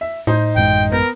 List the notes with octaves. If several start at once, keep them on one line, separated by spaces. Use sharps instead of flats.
E5
A2 D#4 C5
A1 F#2 G#3 G5
B3 A#4